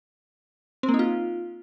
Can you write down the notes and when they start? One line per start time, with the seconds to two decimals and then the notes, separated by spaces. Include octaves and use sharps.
0.83 C4
0.89 A#3
0.94 D#4
0.99 F4